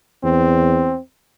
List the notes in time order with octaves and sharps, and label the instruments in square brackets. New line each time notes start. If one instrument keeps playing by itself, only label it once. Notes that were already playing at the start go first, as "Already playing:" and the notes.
[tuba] E2 [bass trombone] C4